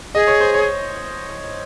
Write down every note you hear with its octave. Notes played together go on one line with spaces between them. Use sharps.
G#4 D#5
C#5
C5
C#5